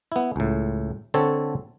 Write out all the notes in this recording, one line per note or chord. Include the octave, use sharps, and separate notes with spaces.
B3 E4
C#2 A2
D3 C4 A4 C#5